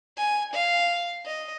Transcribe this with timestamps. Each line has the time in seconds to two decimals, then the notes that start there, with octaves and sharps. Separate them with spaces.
0.17 G#5
0.53 F5
1.26 D#5